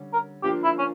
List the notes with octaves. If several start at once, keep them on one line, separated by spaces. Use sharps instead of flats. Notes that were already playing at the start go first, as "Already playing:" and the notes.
Already playing: D3 G3 C#4
A#4
F3 A#3 D4 F4 G4
E4
C#4